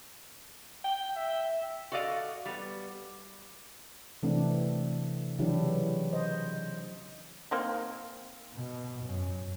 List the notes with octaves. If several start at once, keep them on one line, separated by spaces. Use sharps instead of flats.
G5
E5
F#4 A4 D5 D#5 F5
G3 B3
C3 E3 A3 C4 D4
C#3 E3 F#3 D4 E4 G4
C5 D#5
A#3 C4 D#4
B2
F#2